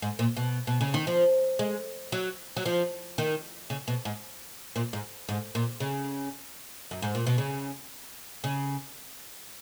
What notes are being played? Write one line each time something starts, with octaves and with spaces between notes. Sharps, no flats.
G#2
A#2
B2
B2
C#3
D#3
F3
G#3
F#3
F#3
F3
D#3
C#3
B2
G#2
A#2
G#2
G#2
A#2
C#3
F#2
G#2
A#2
B2
C#3
C#3